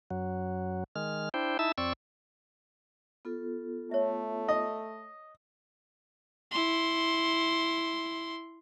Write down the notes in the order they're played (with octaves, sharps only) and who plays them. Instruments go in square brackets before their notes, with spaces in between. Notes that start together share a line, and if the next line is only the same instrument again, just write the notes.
[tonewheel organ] F#2 F#3
D#3 G#3 F6
D4 E4 C5 G5
D#4 E4 E5 A5 E6
F2 C4 D5 C#6 E6
[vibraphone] B3 F4 A4
[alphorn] A3 [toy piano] C#5 E5
[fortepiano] D#5
[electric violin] E4 C6